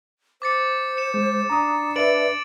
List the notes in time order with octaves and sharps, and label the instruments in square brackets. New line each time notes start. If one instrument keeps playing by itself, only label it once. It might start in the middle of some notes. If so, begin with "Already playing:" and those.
[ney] C5 [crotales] D6 A6 C#7
[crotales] C#7 E7
[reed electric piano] G#3
[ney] D4 [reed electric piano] A#5 D#6
[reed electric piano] B4 D5 E5 [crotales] A6 D7 F#7